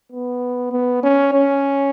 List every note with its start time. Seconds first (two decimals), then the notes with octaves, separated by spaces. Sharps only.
0.12 B3
0.72 B3
1.03 C#4
1.33 C#4